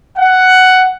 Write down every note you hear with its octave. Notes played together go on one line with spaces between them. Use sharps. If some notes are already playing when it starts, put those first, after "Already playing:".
F#5